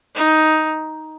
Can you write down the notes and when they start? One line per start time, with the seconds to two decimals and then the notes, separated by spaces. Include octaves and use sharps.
0.15 D#4